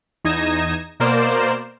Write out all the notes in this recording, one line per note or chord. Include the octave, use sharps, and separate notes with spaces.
E2 D#4 G#6 A#6 D#7 E7
B2 A#3 A#4 C5 D5 E7